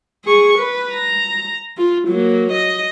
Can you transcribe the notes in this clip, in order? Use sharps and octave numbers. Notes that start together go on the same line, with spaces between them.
G#4 C#6
B4
A#5
F4
F#3 A#3
D#5